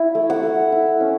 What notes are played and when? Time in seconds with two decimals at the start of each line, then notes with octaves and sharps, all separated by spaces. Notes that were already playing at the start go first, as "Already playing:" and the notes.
Already playing: E4
0.15 A3
0.30 F#5
0.43 A3
0.72 E4
1.00 C#4